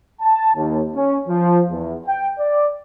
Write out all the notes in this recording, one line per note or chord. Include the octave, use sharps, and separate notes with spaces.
A5
D#2
C#4
F3
E2
G5
D5